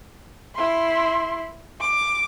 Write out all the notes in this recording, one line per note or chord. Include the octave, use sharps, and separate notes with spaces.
E4 C6
D6